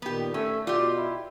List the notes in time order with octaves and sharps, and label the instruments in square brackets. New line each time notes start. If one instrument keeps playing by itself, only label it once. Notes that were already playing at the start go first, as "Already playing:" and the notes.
[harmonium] A#2 D#3 [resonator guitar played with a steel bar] B3 G4
[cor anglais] A3 [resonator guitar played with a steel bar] C#4 [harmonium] A4
[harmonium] B2 [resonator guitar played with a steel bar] F4 G4 [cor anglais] D5
[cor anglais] E4